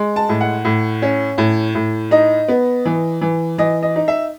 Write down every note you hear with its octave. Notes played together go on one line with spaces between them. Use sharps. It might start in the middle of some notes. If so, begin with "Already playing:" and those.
Already playing: G#3
A5
A2
F#5
A2
C#4
A2
A2
D#4 D#5
B3
E3
E3
E3 D#5
D#5
D#4
E5